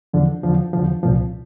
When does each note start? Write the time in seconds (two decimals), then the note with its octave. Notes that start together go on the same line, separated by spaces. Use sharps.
0.13 E2 D3 F3
0.43 E2 D3 F3
0.73 E2 D3 F3
1.03 C2 A#2 F3